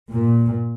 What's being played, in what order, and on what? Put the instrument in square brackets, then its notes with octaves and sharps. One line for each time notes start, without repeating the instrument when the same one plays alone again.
[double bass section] A#2